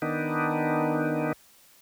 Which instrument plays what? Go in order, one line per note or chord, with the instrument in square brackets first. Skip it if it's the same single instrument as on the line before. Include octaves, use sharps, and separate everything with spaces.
[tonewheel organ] D#3 B3 D4 D#4